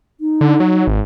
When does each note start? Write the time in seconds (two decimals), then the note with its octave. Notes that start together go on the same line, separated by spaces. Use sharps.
0.21 D#4
0.41 D3
0.60 F#3
0.87 G#1